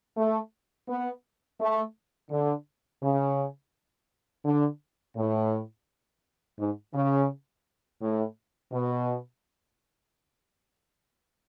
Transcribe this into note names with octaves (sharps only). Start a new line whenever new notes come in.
A3
B3
A3
D3
C#3
D3
A2
G#2
C#3
A2
B2